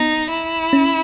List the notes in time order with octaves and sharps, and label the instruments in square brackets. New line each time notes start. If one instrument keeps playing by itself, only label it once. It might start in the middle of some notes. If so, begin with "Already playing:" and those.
Already playing: [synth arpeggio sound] B3 [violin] D#4
[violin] E4
[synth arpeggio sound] C#4